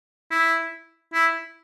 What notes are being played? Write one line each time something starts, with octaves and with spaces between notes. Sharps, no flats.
E4
E4